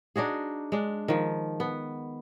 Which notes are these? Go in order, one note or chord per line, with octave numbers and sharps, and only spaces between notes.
D4 D#4 F#4 G#4
G#3 D4
D#3 F3
B3